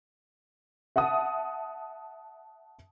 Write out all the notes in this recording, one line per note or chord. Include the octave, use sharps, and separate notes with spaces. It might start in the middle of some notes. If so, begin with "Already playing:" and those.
E5 F#5 A5 D#6